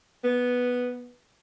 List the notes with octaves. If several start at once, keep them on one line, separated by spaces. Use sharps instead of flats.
B3